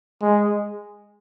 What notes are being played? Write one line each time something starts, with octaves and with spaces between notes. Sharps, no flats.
G#3